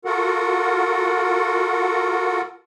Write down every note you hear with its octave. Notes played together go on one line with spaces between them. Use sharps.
F4 F#4 A4 A#4 F#5